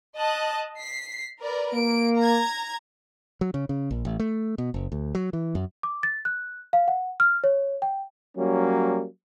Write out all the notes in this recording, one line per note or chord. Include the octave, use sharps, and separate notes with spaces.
D#5 A5 F#6
B6 C7
A#4 B4 D5
A#3 D7
A#5 G#6
F#3
C#3
C#3
A#1
A1
A3
B2
F#1
D2
F#3
E3
F#2
D6
A6
F#6
F5
F#5
F6
C#5
G5
F#3 G3 A#3 C#4